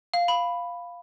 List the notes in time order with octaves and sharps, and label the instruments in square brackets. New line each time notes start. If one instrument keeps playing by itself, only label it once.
[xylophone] F5
B5